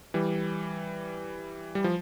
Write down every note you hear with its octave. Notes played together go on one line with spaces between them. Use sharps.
E3 G3
G3
F3